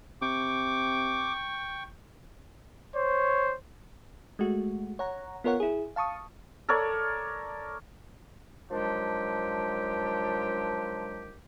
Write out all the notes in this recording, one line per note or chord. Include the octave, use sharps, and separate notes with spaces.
C3 G5 C#6 D6
C5 C#5
G#3 A3 F#4
C#5 F#5 A#5
B3 F4 A#4 C#5 F#5
E4 G#4
F5 A5 C#6 D#6
A4 A#4 C#5 D5
D#3 F3 F#3 G#3 D4 G4